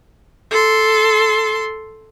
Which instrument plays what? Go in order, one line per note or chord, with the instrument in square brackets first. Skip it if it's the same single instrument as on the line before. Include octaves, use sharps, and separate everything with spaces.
[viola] A4 C6